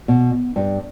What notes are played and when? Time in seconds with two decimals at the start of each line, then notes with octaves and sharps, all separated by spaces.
0.08 B2
0.56 G2